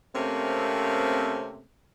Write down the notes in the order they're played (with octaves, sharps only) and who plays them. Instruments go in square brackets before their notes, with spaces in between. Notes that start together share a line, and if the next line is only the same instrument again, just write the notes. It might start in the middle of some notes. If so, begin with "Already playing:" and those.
[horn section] C3 A3 A#3 C4 C#4